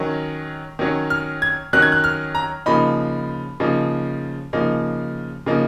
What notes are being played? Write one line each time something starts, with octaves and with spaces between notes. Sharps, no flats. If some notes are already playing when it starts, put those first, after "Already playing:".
Already playing: D#3 F#3 C#4
D#3 F#3 C#4
F6
G#6
D#3 F#3 C#4 F#6
G#6
F#6
F6
A#5
C#3 F3 A#3 D#4 B5
C#3 F3 A#3 D#4
C#3 F3 A#3 D#4
C#3 F3 A#3 D#4